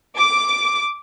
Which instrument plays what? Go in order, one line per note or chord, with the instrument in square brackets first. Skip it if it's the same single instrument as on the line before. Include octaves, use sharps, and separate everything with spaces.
[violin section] D6